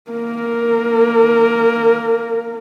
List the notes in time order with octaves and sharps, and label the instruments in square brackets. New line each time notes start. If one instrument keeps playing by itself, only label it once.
[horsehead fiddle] A#3 A#4